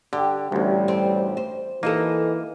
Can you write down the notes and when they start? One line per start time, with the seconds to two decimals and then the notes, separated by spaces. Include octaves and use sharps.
0.13 D3 G4
0.52 A1 D2 G3
0.88 C4
1.37 C5
1.83 E3 A#3 D#4 F#4 A4